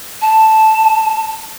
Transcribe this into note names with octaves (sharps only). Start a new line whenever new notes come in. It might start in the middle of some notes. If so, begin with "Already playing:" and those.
A5